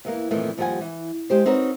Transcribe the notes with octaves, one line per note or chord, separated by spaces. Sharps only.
E2 E3 A#3
F2 A#2 D#3 E3 A3
D#2 F3 G3 G#4 F#5 G#5
E3
G#3 G4 C5
C4 D#4 F#4 A#4 B4 C#5